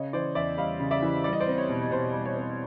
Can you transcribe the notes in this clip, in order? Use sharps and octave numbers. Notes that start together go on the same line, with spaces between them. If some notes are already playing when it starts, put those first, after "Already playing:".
Already playing: C#3 C#5 D#5
E3 C5 D5
E2 D5 E5
G3 D#5 F5
C#3
D5 E5
E3
G3 D5
D#5
C5 D5
C4
C#5
B2
B2 C5
G3
C#5
C4